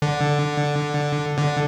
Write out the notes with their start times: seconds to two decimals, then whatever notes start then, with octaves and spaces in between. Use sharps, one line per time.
0.02 D3
1.38 D3